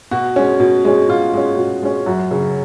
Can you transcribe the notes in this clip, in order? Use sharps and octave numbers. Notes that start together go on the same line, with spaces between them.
B2 F#4
G#3 C#4
B2
G#3 C#4
B2 F4
G#3 C#4
B2
G#3 C#4
F#2 F#4
C#3 F#3